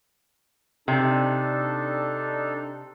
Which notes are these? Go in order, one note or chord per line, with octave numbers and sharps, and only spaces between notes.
C3 D4 D#4 A4